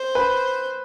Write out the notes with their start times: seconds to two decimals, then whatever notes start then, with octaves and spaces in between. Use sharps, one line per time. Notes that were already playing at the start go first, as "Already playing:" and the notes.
Already playing: C5
0.15 B4